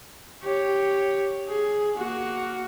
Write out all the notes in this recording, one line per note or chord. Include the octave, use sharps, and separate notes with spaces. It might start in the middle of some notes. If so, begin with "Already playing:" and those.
G4 C#5
G#4
A#3 F#4